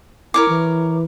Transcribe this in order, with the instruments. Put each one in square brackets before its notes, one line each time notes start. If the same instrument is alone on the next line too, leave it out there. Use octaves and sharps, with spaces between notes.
[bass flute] E4 [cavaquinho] A#4 C#5 D6
[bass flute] E3